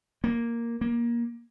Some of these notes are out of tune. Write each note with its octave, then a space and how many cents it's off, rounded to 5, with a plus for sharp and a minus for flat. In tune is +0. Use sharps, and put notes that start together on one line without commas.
A#3 +0
A#3 +20